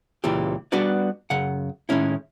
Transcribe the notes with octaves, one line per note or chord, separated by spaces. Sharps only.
C#2 A#2 E3 G4
G3 B3 D4 F#4 B4 D5
F#2 C#3 F#5
A2 D#3 G#3 C#4 E4